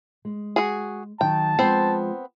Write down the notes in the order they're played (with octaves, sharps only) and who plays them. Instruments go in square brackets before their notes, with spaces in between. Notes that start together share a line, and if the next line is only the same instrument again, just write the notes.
[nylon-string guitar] G#3
[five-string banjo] F#4 G#4
[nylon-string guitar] D#3 F#3 [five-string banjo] G5 [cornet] A5
[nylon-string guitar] F3 G#3 [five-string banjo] B3 C4 C5